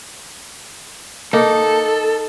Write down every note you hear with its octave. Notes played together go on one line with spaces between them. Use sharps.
A#3 D#4 A4